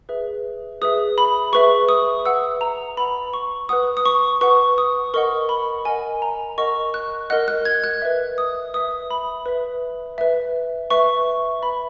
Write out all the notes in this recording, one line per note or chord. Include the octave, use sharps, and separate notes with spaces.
G#4 B4 E5
G#4 B4 E5 D#6
B5
G#4 B4 E5 C#6
D#6
B4 F#5 E6
A#5
B4 F#5 B5
C#6
B4 F#5 D#6
D#6
C#6
B4 F#5 C#6
D#6
A#4 D#5 F#5 C#6
B5
A#4 D#5 F#5 G#5
A#5
A#4 D#5 F#5 C#6
F#6
A#4 D#5 F#5 F#6
F#6
G#6
F#6
B4 E5
D#6
B4 E5 D#6
B5
B4 E5
B4 E5
B4 E5 C#6
B4 E5 B5